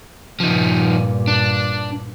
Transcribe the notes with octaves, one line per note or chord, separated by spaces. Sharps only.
G2 A#2 F3 D#4
D4